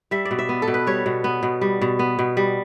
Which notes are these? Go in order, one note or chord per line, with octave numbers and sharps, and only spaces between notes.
G3 E5
D5
B2
E5
B3
A4
B2
B4
G3 C#5
B2
B3
B2
G3
B2
B3
B2
G3